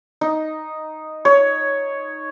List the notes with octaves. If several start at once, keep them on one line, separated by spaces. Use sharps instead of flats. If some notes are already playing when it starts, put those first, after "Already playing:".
D#4
C#5